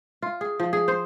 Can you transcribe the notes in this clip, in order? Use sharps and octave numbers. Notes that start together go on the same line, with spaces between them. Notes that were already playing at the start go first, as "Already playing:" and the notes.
F4
G#4
F3
G#4
C5